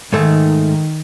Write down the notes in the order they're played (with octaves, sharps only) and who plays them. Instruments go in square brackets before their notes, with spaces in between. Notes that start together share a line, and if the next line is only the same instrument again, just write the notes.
[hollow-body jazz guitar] G#2 A3 [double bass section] D#3